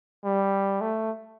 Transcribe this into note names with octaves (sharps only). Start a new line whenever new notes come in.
G3
A3